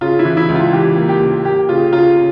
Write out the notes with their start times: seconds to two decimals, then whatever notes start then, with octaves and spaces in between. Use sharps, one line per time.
0.01 C#3 F4
0.19 E4
0.25 E3
0.37 E4
0.49 C#2
0.55 F4
0.72 E3 G4
0.97 A#3
1.09 G4
1.21 C#2
1.45 A#3 G4
1.69 C#3 F4
1.93 C#3 F4
2.16 C#3